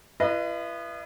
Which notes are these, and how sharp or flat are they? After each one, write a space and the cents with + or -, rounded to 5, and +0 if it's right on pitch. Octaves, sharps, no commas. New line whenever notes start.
E4 +45 B4 -10 D#5 -30